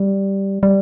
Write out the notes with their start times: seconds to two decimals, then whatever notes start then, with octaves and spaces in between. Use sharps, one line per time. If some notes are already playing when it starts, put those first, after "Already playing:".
Already playing: G3
0.63 G3